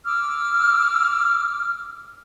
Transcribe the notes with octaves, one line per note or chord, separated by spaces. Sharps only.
D6 E6 F6